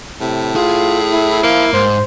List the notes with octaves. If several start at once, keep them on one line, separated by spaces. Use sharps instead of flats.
A2 C3
F4 G#4
E4
A#3 C5 F5
G#2 C5